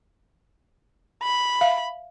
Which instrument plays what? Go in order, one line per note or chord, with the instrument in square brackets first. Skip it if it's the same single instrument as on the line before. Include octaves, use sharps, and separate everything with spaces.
[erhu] B5
[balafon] E5 F5